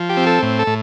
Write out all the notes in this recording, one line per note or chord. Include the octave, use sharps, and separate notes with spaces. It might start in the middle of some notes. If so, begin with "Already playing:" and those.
Already playing: F3
G4
C4
A4
A2
A4
A2